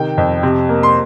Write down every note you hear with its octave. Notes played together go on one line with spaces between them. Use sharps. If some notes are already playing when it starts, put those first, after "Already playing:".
Already playing: C3 D#3 G5
F2
C3
A#3
C6